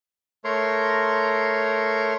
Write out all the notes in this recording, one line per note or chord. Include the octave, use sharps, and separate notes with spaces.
A3 A#4 C#5 A#5 C6